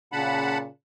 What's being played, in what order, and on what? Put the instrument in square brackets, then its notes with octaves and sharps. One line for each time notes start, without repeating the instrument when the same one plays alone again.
[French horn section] A#2 C#3 [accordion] F#5 A5 B5